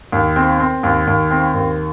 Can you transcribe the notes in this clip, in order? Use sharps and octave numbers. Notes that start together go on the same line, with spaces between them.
D#2
C4
C4
D#2
D#2
C4
D#2